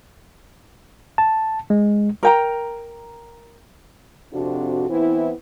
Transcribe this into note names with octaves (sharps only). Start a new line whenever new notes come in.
A5
G#3
A#4 G5 A#5
F2 C3 D4 F#4
E3 B3 C4 E4